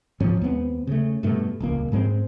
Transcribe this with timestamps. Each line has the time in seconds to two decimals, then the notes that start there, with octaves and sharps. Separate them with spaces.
0.20 D1 G#2 F3 C#4
0.41 D#2 G#3 B3 C4
0.87 C#3 A3
1.23 G2 B2 A3
1.60 D#1 C#2 A#3
1.92 G#2 G#3 B3 C4